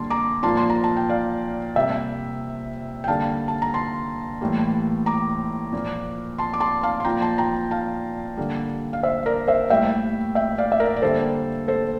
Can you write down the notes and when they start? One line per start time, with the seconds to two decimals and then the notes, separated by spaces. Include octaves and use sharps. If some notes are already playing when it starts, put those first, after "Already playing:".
Already playing: D3 G3 A#3 A5 C6
0.10 A#5 D6
0.43 A#2 F3 A#3 A5 C6
0.57 C6
0.70 A#5
0.84 A5
0.97 G5
1.09 D5 F5
1.76 C3 G3 A#3 E5 G5
3.04 G5
3.08 D3 G3 A#3 F5 A5
3.48 A5
3.62 A#5
3.74 A5 C6
4.41 A2 E3 G3 A#3
5.06 A#5 D6
5.73 A#2 F3 A#3
6.38 A5 C6
6.53 D6
6.60 A5 C6
6.83 F5 A5
7.00 C6
7.05 A#2 F3 A#3 G5 A#5
7.21 A5 C6
7.38 G5 A#5
7.71 F5 A5
8.37 D3 G3 A#3
8.93 F5
9.03 C5 E5
9.26 A#4 D5
9.48 C5 E5
9.70 A2 G3 A#3 E5 G5
10.35 E5 G5
10.58 D5 F5
10.72 E5
10.80 A#4 D5
10.96 D5
11.02 D3 G3 A#3 A4 C5
11.68 A4 C5